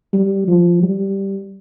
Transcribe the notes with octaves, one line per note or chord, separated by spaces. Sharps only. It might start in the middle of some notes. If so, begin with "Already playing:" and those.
G3
F3
G3